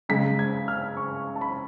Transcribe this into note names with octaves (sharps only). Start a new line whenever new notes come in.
C#3 G#3 B6
G#6
F6
C#6
A5
B5